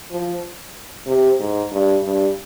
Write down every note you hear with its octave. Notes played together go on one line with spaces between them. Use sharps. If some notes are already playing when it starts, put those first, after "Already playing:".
F3
C3
G#2
G2
G2